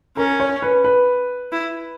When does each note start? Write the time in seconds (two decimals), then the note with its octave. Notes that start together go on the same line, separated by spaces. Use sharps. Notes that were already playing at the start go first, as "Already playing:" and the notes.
0.17 C#4 A#4
0.40 C#5
0.62 B4
0.84 B4
1.52 E4